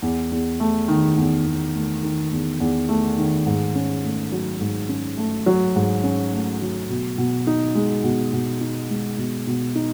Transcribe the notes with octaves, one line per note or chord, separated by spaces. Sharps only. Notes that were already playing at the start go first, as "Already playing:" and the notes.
E2
E2
A3
D#3
E2
E2
A3
D#3
E2
E2
A3
D#3
G#2
C#4
A3
F#3
G#2
C#4
A3
F#3
G#2
C#4
A3
F#3
B2
B2
D#4
G#3
B2
B2
D#4
G#3
B2
B2
D#4